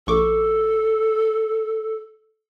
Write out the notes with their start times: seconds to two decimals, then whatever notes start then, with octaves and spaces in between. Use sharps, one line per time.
0.07 A#1 A4 C#6 D6